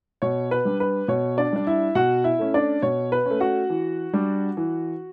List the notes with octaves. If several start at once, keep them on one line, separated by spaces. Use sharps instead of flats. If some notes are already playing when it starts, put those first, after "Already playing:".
B2 C#5
B4
G3 D4
B4
B2 C#5
D4 D5
G3 D4
E4 E5
B2 F#4 F#5
E4 E5
A3 C#4
D4 D5
B2 C#5
B4
A3 C#4
F#4 F#5
E3
G3 D4
E3